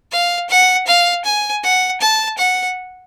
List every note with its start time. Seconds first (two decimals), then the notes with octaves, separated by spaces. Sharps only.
0.12 F5
0.50 F#5
0.87 F5
1.25 G#5
1.63 F#5
2.01 A5
2.38 F#5